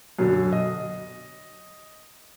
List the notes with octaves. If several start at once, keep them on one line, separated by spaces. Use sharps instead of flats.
F#2 B2 D3 F#3
D#5